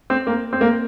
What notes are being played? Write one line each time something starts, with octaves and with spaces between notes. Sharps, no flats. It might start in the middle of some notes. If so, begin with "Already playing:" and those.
C4
A#3
C4
A#3